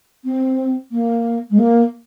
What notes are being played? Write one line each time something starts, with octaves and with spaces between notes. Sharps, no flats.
C4
A#3
G#3
A#3